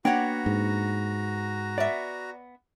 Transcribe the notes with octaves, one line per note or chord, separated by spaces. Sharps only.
A#3 B3 D4 F#4 C#5 F#5 G5 A#5
G#2
B3 D5 E5